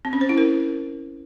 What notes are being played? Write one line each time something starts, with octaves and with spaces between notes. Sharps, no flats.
C4
C#4
C5
E4
A#4